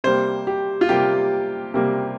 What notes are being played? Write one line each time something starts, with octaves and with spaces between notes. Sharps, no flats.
C3 G3 A#3 C5
G4
F4
C3 G3 A#3 G4
C3 G3 A#3